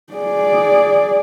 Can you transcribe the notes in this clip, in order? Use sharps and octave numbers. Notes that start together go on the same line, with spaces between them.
G#4 D5